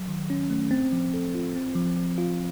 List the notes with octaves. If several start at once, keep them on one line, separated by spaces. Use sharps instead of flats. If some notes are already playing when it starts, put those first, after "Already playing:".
Already playing: F#3
D#3
C#4
A3
C4
F3
A4
F4
C4
F3
F3
F4